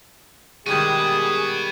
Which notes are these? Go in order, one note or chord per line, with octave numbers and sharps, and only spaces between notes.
D#3 G3 G#3 F#4 G#4 B4 G#6 D#7